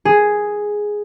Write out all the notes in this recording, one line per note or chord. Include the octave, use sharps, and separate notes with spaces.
G#4